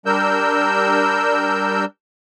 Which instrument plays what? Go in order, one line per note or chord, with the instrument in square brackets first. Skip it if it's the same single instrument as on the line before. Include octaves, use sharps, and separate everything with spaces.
[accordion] G3 D4 A#4 E6 G6